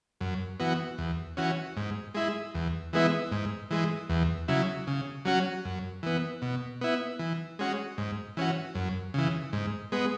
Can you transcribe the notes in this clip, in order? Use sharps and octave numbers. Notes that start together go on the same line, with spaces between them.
F#2
E3 B3 F#4
E2
E3 C#4 F#4
G#2
G#3 E4
E2
E3 G#3 B3 E4
G#2
E3 G#3
E2
C#3 F#3 E4
C#3
F#3 C#4 F#4
F#2
E3 B3
B2
B3 E4
E3
G#3 C#4 F#4
G#2
E3 C#4 F#4
F#2
C#3 E3
G#2
G#3 B3